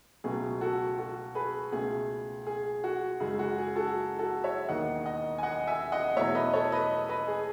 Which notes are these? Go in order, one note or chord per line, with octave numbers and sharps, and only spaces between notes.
C#2 B2 F#3 A3 G#4
F#4 A4
F#4 A4
G#4 B4
C#2 B2 A3 G#4
G#4
F#4
F#2 C#3 G#3 G#4
F#4
G#4
F#4 A4
F#4 A4
C#5 E5
E1 D#2 D#3 D#5 F#5
D#5 F#5
G#5
D#5 F#5
E5 G#5
D#5 F#5
E2 B2 A3 C#5 E5
B4 D#5
A4 C#5
B4 D#5
B4 D#5
G#4